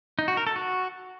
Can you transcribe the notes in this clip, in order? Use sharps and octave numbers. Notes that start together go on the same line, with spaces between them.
D#4
F#4
A#4
A4
F#4